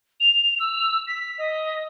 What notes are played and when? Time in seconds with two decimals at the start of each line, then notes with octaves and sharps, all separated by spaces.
0.20 F7
0.60 E6
1.07 B6
1.38 D#5